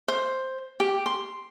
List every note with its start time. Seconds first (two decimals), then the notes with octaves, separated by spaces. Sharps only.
0.08 C5
0.80 G4
1.06 C6